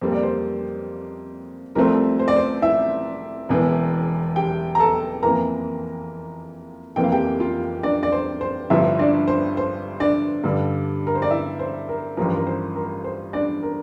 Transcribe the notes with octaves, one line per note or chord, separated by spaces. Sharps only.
F2 C3 G3 A#3 C5
D5
C5
C2 C3 F3 A3 C4 A#4
C5
D5
C5
E4 E5
E1 E2 E3
G4 G5
A#5
A4 A5
F2 E3 A#3 A#4 A#5
F1 F2 E3 A#3 G5
F5
G4 G5
F4 F5
D4 D5
D5
C5
C5
G1 G2 F3 E4 E5
D4 D5
C5
C5
D4 D5
G2 D3 G3
A#4
C5
D5
E4 E5
C5
A#4
A1 G2 F3 A#4
A#4
C5
A#4
C5
D4 D5
A#4